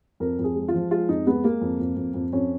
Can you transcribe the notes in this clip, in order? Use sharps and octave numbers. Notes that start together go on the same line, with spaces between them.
F2 A#4
F2 G#4
G#3
F4
F3
G#3 F4
F2 D#4
G#3 B3
G#3 A#3
F2
F2
F2
F2
F2 C#4